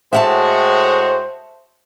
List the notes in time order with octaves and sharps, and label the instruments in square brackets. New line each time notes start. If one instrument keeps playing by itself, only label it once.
[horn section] A2 G#3 F#4 [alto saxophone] C5 [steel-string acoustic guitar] E5 F#5 A5